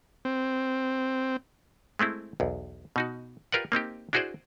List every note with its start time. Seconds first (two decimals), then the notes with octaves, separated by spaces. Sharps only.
0.25 C4
1.99 G#3 A3 C4 E4
2.40 B1 E2
2.96 B2 D#4 F#4
3.52 F4 G4 A#4 B4 D5 F#5
3.72 A#3 C4 D#4 G4
4.13 D4 E4 F#4 G#4 C5 D5